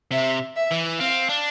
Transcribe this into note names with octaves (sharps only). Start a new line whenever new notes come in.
C3 E5
E5
E3
C4 F5
D4